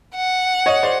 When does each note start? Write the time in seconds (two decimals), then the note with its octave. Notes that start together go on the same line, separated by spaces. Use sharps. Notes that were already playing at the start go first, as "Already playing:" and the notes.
0.16 F#5
0.66 C#5 D#5
0.83 C5 D5